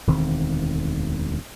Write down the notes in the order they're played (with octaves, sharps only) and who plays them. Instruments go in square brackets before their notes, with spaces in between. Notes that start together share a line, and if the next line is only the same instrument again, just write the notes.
[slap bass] E1 D2 D#3 C4